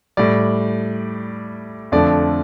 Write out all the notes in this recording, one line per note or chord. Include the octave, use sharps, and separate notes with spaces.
A2 G3 D5
F2 D3 F3 A3 D5